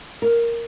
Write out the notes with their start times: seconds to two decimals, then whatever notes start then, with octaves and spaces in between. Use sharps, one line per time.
0.22 A#4